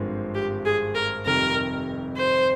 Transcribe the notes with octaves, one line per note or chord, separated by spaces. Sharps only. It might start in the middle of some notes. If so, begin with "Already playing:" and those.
Already playing: G#1 G2 F3 G#3 C4
G4
G#4
A#4
F1 F2 D#3 G3 A#4
C5